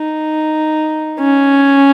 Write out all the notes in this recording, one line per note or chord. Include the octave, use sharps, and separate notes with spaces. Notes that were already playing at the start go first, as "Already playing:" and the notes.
Already playing: D#4
C#4